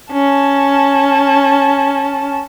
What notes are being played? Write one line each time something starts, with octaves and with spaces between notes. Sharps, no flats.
C#4 A5